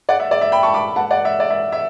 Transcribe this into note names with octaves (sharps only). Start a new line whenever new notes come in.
D5 F#5
E5
D5
E5
G5 B5
A5 C#6
B5 D6
F#5 A5
D5 F#5
E5
D5
E5
E5